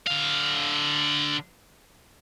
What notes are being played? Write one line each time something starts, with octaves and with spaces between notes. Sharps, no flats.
D3 F5